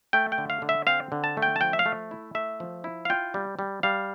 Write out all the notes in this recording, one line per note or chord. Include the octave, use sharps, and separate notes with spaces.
A3 G5
G5
D3
F5
D3
E5
C4 F5
D3
A5
A3
G5
A5
F3 G5
E5
F5
A3
E4
A3 E5
F3
E4
F5
F4 G5
G3
G3
G3 F5